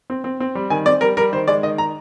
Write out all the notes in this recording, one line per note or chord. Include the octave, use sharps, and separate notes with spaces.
C4
C4
C4
G3
D#3 G#5
C4 D5
G3 A#4
G3 A#4
D#3 C5
G#3 D5
D#3 D#5
A#5